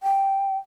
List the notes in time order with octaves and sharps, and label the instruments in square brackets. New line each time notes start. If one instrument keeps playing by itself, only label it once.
[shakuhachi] G5